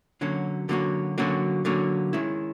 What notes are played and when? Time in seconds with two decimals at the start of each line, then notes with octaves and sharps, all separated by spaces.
0.21 D3 F#3 A#3 C#4 F#4
0.69 D3 F#3 A#3 C#4 F#4
1.18 D3 F#3 A#3 C#4 F#4
1.65 D3 F#3 A#3 C#4 F#4
2.13 D#3 G#3 C#4 E4